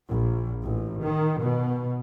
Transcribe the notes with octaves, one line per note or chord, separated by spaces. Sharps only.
A#1
A1
D#3
B2